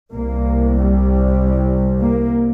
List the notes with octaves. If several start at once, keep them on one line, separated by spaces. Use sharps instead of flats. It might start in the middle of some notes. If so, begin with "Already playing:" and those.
C2 C3 A#3
G3
A#3